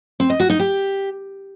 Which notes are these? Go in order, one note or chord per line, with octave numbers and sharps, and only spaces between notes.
C4
D#5
F#4
D#4
G4